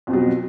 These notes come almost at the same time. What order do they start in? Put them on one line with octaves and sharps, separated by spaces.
F2 B2 F#3